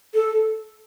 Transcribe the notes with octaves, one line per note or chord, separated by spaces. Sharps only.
A4